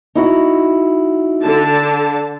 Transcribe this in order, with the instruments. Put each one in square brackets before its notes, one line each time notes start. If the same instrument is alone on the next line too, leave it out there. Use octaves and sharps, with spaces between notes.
[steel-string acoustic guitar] D#4 E4 F#4
[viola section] D3 A5